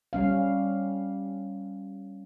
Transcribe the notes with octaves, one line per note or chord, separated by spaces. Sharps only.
G3 C#4 F5